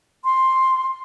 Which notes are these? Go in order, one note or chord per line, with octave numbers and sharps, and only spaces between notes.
C6